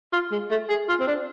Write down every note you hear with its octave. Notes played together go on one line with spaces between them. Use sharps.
F4
G#3
A3
G#4
F4
C4
D4